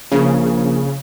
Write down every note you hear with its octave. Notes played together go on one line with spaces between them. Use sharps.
A#1 C#3